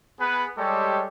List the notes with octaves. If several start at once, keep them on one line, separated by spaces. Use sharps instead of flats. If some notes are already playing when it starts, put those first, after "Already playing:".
B3 G#4 B4
G3 G#3 G4 A4 C#5